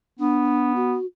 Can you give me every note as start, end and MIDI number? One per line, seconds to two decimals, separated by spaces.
0.19 0.96 59
0.19 0.72 62
0.76 1.06 66